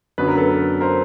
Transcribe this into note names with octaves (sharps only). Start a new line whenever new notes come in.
F#2 D3 F#3 B3 B4
A#4
A4 B4
A#4 C5